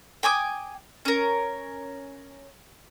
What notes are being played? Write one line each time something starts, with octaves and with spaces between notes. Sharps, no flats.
G5 G#5 D6 D#6
C#4 A#4